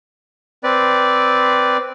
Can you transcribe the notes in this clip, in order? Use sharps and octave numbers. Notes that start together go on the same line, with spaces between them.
C4 B4 D5